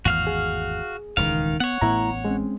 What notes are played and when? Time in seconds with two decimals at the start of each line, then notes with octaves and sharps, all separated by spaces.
0.05 G#1 E2 A2 F#4 F5 F6
0.27 G#4
1.17 D#1 C#2 D#3 E3 F5
1.60 B3 C#5 F#5
1.81 A1 A2 A3 B3 E4 A#5
2.25 G#3 C4 C#4